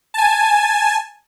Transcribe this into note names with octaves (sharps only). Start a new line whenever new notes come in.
G#5 A5